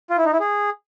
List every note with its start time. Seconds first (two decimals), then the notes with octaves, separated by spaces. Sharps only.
0.10 F4
0.18 E4
0.25 D#4
0.32 E4
0.40 G#4